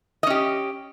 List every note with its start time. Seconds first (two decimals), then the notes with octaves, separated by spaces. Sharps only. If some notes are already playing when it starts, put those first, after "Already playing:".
0.23 D#5
0.27 C#4
0.30 G4